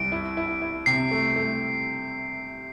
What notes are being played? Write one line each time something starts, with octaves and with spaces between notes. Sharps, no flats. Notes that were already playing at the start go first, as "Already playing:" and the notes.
Already playing: C2 D7
E4
E4
E4
C3 C7
A3
A3